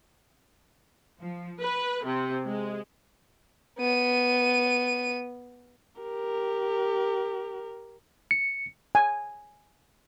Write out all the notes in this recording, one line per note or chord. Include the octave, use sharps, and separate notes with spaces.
F3
B4
C3
G#3
B3 D#7
G4 A#4
C#7
G#5